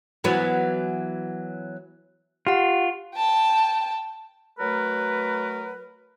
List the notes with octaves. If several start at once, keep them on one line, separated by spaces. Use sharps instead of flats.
E3 F#3 B3
F4 G4 F#5
G5 A5
F#3 A3 F#4 A#4 B4